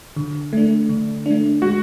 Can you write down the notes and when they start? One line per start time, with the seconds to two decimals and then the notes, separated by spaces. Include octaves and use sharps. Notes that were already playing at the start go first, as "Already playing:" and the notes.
0.16 D3
0.53 A3 D4
0.89 D3
1.26 A3 D4
1.62 G#3 F#4